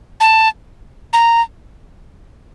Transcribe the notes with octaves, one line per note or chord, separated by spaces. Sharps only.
A5
A#5